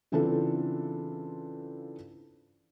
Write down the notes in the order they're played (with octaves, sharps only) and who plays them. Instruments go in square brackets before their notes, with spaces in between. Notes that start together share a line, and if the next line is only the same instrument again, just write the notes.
[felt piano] C#3 E3 C4 D4 F4 A4